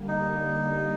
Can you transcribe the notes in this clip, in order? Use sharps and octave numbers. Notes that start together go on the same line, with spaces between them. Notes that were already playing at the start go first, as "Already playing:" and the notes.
Already playing: D3 G3 A#3
D#4